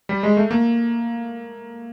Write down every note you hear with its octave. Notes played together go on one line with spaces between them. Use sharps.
G3
G#3
A3
A#3